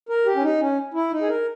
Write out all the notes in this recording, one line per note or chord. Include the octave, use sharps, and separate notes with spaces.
A#4
G4
C#4
D#4
C#4
E4
D#4
G#4
A#4